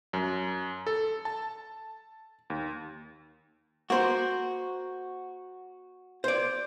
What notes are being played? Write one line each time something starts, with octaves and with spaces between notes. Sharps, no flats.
F#2
A4
A5
D#2
A#3 F#4 C5
C5 D5